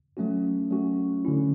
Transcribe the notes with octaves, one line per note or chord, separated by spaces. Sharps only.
F#3 A3 C#4 F#4
F#3 A3 C#4 F#4
D3 A3 C#4 E4